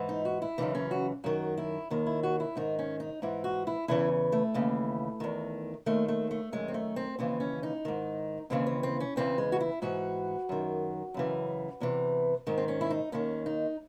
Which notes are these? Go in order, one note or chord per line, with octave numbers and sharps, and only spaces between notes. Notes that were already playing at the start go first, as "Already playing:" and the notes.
Already playing: G#2 E3
D#4
F#4
E4
F#2 C#3 E3 D#4
C#4
F#4
F#2 D#3 F#4
E4
D#2 D#3
E4
F#4
E4
G#2 D#3 D#4
C#4
D#4
G#2 E3 E4
F#4
E4
E2 C#3 E3 E4
A3
D#2 C#3 E3
E2 D#3
D#2 D#3 A3
A3
A3
F#2 D#3 G#3
C4
A3
C4
D#2 C#3 E3 C4
C#4
D#4
G#2 D#3
D#2 C#3 E3 C4
C4
C4
C#4
E2 C#3 E3 C4
G#3
F#4
E4
G#2 E3 F#4
F#2 D#3
F#2 C#3 E3
E2 C3 E3
G#2 D#3 C4
C4
C#4
E4
D#4
D#2 D#3 C#4
D#4